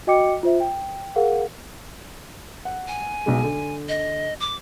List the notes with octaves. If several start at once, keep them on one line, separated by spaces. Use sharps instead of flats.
F#4 D#5 G5 D6 C#7
F4 C5 E5
G5
G#4 A#4 F5 F#5
F#5
G#5
B1 B2 G#3
D3
D#5
D6